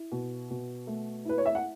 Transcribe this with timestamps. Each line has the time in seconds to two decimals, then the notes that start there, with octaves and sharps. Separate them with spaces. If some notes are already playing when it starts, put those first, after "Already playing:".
Already playing: E4
0.12 B2
0.50 B2
0.87 A3
1.25 E4 B4
1.38 C#5
1.46 E5
1.55 F#5